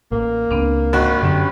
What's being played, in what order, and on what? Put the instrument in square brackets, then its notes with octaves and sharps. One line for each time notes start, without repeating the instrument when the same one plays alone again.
[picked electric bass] A1 [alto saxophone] A#3
[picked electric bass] C#2 [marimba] B3 C4 D4
[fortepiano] G#1 F#4 [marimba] D#5
[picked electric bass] F#2 D3 [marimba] B3 C#4 [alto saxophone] G4